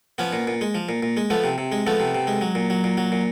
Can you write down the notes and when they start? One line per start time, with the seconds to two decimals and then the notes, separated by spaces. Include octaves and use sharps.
0.18 F3 B3 C#4
0.33 A#2
0.47 A#2
0.61 G#3
0.75 F3
0.89 A#2
1.03 A#2
1.17 G#3
1.30 F3 A3 B3
1.44 C3
1.58 C3
1.72 G#3
1.86 F3 A3 B3
2.00 C3
2.15 C3
2.27 G#3
2.41 F#3
2.55 A#2
2.70 F#3
2.84 A#2
2.97 F#3
3.12 A#2